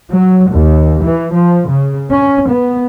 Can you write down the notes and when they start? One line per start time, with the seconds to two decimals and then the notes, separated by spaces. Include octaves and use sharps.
0.11 F#3
0.51 D#2
1.03 E3
1.34 F3
1.69 C#3
2.11 C#4
2.49 B3